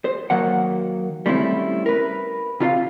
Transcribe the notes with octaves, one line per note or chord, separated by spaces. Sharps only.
C5
D#3 F#3 A#3 F#5
G3 A3 C4 C#4 E4
A#4 B4
C3 F4 C#5 F5